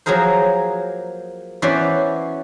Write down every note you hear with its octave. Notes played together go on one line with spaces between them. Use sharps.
F3 F#3 A#3 G#4 A#4 C5
E3 B3 C#4 F#4 C5 D5